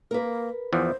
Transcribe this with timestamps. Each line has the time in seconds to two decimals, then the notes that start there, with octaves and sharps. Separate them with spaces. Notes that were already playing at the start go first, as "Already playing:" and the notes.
0.11 A#3 A#4 B4
0.73 E2 E3 F3 C5